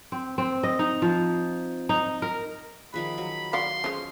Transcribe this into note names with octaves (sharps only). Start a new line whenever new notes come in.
C4
C4
D#5
D#4
F3
D#4
A#4
D#3 F3 G#4 B5
F#3
F#4 D5 F5 C6
F3 G#3 C#4